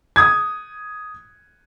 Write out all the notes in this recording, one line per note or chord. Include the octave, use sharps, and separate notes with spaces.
D#6 G#6